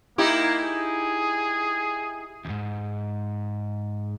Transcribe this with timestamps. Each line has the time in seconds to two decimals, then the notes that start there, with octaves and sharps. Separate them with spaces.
0.18 A#3 D#4 E4 G4
0.63 G#4
2.45 D2 G#2